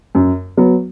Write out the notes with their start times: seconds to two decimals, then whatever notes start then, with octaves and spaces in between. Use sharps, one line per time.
0.15 F#2
0.57 F#3 B3